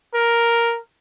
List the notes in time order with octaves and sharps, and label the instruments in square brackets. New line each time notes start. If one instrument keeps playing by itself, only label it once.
[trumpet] A#4